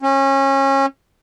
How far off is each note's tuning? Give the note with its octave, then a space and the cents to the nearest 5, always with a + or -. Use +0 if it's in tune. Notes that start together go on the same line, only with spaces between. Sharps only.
C#4 -25